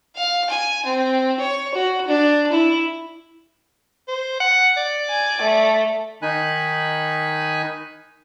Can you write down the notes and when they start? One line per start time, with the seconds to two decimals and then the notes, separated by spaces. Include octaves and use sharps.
0.16 F5
0.49 G#5
0.85 C4
1.39 C#5
1.74 F#4
2.08 D4
2.52 E4
4.08 C5
4.40 F#5
4.77 D5
5.09 G#5
5.41 A3
6.22 D#3 D#4 G#5 B5 F#6